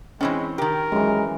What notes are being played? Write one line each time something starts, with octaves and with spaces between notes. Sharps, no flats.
E3 G#3 C4 C#4 G5
D#3 G4 A#4
F#2 E3 G#3